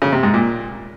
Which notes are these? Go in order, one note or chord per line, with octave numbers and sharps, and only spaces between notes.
C#3
C3
G#2
A#2